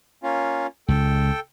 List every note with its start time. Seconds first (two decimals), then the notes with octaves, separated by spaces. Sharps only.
0.24 A#3 C#4 F4
0.89 C#2 A4 G5